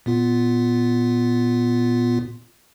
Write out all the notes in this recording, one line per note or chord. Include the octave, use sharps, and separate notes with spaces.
A#2 B3 F4